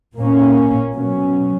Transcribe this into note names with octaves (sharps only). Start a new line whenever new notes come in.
A#2 A#3 C#4
B2 F#3 C#4